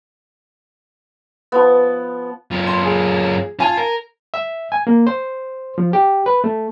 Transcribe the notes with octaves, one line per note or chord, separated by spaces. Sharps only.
F3 B3
F#2 F4
C6
G#4
F4 G#5 A5 G#6
A#4
E5
G#5
A#3
C5
F3
G4
B4
A3